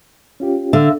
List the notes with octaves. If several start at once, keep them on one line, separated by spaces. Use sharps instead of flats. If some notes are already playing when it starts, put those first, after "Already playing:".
C#4 F4 G4
D3 E5 F5 E6